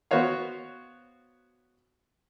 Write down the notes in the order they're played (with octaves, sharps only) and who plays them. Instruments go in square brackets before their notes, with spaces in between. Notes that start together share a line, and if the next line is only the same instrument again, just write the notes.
[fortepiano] B3 F#4 C5 C#5 F5